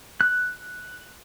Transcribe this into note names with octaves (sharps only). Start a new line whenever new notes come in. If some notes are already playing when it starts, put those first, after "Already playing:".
F#6